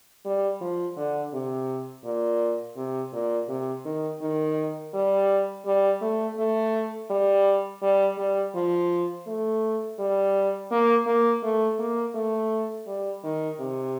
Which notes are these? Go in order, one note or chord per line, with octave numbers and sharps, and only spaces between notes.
G3
F3
D3
C3
A#2
C3
A#2
C3
D#3
D#3
G3
G3
A3
A3
G3
G3
G3
F3
A3
G3
A#3
A#3
A3
A#3
A3
G3
D#3
C3